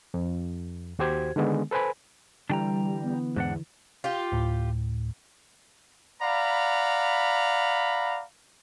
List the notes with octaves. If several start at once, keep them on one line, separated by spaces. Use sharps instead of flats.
F2
D#2 F#4 G4 C5 G#6
D3 D#3 G#3 B3
A4 B4 C5 G#5 B5
D3 E3 G3 D4 G5 A#5
B3
E2 G#2 D4 F#5
F4 G4
D2 A2
D5 F5 F#5 A#5 B5